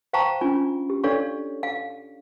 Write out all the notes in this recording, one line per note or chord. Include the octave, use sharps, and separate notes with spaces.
C5 F5 G5 A5 A#5 C#6
C#4 D4 F4 G#5
G4
D4 A4 C#5 D5 F5 C#6
F5